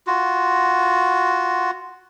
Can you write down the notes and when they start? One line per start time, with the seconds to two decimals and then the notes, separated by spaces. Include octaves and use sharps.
0.07 F4 F#4